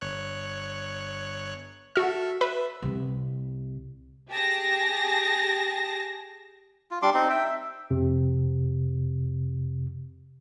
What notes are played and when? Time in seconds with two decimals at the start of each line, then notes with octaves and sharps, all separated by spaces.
0.01 G1 C#5 F#6
1.96 F#4 A4 E5 F6
2.41 B4 E5
2.82 C2 C3
4.30 G4 G#4 A5 A#6
6.91 F4
7.02 G3 D4 C6 D6
7.14 C4 D#4
7.30 E5 G5
7.44 E5
7.90 F2 C3